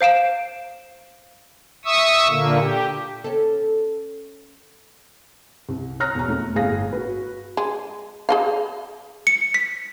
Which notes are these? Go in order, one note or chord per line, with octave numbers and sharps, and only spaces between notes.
C5 F5 D7 E7
E5 C#6 D#6 E6
A#2 D3 A#3
G4
C#4 A4
C2
C#5 A#5 F6 F#6 A#6
E1 A#5
F2 A3
G1 A2 G#4 F5 A#6
F#4 B4
G#3
G#4 D#5 F5
C#7
B6